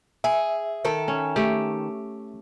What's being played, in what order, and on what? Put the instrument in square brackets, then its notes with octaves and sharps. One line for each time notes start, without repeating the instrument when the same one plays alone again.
[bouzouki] G#4 [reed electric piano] E5
[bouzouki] D#3 A4
[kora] C#4
A3 G4